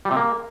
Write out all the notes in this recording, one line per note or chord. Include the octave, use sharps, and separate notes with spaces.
G3
C3
A#3